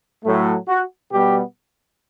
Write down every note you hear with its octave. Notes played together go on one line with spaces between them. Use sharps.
A2 F#3 A3
F#4
B2 G3 B3 G4